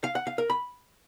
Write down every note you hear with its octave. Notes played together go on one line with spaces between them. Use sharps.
F5
F#5
F5
A#4
B5